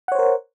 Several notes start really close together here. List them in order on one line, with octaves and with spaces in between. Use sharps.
F#5 C#5 C5 A#4